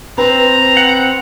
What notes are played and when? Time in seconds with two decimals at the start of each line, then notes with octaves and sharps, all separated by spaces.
0.18 C4 B4 A#5
0.77 F#5